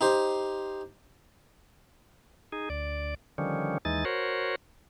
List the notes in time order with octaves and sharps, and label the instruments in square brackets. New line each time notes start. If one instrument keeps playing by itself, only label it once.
[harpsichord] D#4 G4 C5
[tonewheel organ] D#4 G#4
D2 D5
D3 D#3 F3 G3 C#4
D#2 E3 G#3 D#4 A6
F#4 A#4 C5 C#5